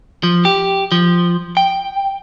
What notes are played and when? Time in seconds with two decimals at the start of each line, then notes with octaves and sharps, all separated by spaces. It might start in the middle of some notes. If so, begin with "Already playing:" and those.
0.23 F3
0.45 G4
0.92 F3
1.57 G5